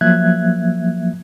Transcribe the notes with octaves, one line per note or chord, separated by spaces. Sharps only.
F3 F#3 A#3 E5 F#6 G#6